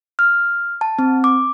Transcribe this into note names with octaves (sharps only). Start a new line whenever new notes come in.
F6
A5
C4
D6